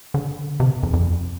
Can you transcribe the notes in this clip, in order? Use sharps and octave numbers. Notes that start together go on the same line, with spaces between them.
D3
C3
F2
F2